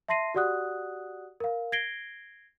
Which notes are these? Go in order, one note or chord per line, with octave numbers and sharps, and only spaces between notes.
E5 A5 C6 A#6 C7 D#7
F#4 G4 D5 F#5 D#6 F#6
A#4 F5
G#6 A#6 C7 D7 G7